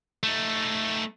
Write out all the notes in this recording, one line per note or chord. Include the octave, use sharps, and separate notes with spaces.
A3 D#4